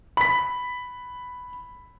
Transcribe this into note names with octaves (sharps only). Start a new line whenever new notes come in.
B5 B6